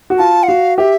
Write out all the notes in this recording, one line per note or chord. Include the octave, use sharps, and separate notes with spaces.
F#4
F4 A5
F#5
F#4 F5
G4 E5